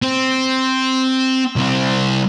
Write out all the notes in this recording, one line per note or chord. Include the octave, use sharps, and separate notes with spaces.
C4
C2 C4